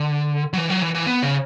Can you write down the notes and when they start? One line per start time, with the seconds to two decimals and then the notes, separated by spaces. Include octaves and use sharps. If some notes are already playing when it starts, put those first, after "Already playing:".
Already playing: D3
0.53 F#3
0.58 E3
0.70 F#3
0.82 E3
0.95 E3
1.06 B3
1.23 C#3